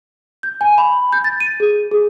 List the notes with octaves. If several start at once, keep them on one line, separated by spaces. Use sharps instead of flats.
G6
G#5
B5
G6
A6
D#7
G#4
G#4